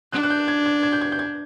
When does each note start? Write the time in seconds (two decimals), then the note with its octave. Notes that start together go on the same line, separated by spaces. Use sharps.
0.12 D4 F#6
0.23 F#6
0.30 G6
0.48 G#6
0.66 G#6
0.83 G#6
0.93 G6
1.01 G#6
1.12 G6
1.19 G#6